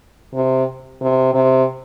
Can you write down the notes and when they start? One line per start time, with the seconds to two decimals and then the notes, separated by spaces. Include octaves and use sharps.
0.34 C3
1.01 C3
1.34 C3